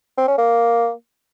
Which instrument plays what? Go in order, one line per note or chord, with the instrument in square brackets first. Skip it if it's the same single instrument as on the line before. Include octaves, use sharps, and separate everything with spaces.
[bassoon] C4
C#4
A#3